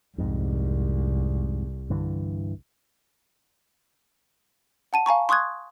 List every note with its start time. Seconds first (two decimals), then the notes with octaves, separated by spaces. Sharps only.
0.18 C2 F2 G#2
1.90 G2 D3 E3
4.93 F#5 A5 D#7
5.06 F5 G#5 A#5 C#6
5.29 C6 C#6 D#6 F#6 G#6